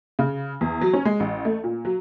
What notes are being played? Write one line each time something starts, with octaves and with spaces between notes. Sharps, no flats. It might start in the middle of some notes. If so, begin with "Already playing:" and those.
C#3
E2
F#3
C#4
G#3
A1
A3
A#2
F#3